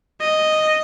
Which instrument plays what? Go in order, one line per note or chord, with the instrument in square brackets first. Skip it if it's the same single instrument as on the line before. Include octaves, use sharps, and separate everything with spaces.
[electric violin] D#5